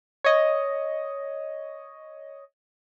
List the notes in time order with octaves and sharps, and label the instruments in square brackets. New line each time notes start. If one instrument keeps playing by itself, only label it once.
[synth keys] C#5 D#5